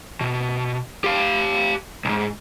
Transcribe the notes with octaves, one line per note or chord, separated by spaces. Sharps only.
B2
G4 F5
B1 G#2